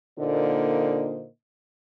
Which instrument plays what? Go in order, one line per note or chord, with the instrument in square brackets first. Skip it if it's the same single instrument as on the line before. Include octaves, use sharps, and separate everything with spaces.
[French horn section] A#2 D3 A#3 D#4 C5 D#5